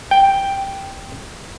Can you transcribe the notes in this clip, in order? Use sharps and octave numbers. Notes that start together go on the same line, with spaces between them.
G5